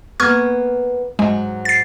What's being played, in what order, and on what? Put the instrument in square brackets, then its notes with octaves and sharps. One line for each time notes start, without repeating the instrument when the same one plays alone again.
[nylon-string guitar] A#3 B3 [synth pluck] C#6 F6 G#6
[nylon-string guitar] G#2 F#3 F#4 [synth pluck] G#3
[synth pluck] A6 C7